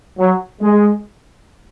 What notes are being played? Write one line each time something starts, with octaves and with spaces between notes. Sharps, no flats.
F#3
G#3